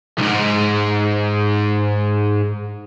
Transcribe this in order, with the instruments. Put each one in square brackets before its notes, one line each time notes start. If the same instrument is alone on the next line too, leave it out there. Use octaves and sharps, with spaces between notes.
[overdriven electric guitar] B1 G#2